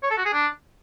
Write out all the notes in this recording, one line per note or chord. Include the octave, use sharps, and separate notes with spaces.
C#5
A4
F#4
G#4
D4